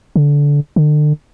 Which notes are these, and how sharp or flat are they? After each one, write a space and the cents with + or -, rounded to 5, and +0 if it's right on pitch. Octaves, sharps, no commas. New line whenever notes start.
D3 -20
D3 +35